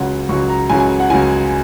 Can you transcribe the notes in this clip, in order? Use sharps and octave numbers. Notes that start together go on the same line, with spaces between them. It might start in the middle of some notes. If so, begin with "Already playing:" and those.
Already playing: C#2 C#3 F#3 F#5
C#2 C#3 F#3 C#6
A#5
C#2 C#3 F#3 G#5
G#5
F#5
C#2 C#3 F#3 G#5